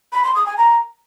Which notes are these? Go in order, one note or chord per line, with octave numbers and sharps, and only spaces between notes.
B5
C6
D#6
G#5
A#5